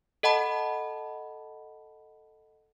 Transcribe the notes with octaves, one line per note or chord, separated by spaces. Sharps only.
A4 D#5 F#5 A5 B5